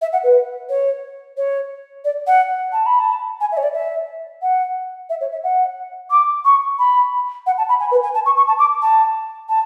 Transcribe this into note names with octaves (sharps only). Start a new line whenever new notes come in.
E5
F#5
B4
C#5
C#5
D5
F#5
A5
B5
A5
G#5
E5
C#5
D5
E5
F#5
E5
C#5
E5
F#5
D6
C#6
B5
F#5
A5
B5
G#5
B4
G#5
A5
C#6
C#6
A5
D6
A5
A5